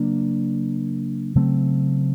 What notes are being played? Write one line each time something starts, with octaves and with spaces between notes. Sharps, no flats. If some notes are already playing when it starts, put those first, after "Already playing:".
Already playing: C#3 F#3 A#3 D4
C#3 F#3 A3 C4